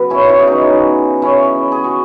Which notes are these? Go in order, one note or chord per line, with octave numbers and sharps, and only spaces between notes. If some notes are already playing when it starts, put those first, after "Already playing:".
Already playing: C#3 F#3 B3
C#4 E4
C#4 E4
G#4
C#3 E3 D#4 F#4
C#4 E4
G#4
F#4